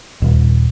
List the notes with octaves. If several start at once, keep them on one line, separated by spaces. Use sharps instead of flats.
D#1